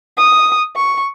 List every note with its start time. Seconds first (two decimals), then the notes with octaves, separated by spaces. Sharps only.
0.17 D#6
0.76 C#6